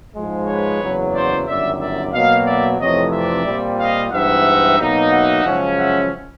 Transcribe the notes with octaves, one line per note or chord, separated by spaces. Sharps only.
G#2 F3 G#3
B4 C#5
F#1 E2 C#3 F#3
C5 D5
G1 F#2 D#3 D5 E5
D5 E5
B2 F#3 A#3 D#5 F5
D5 E5
F2 C3 E3 A3 C#5 D#5
D5 E5
A#2 G3 C4 F4
D#5 F5
G2 E3 G#3 C4 D#4 E5 F#5
B2 F#3 A#3 D#4
E5 F#5
F#2 C#3 F3 G#3 C#4
E5 F#5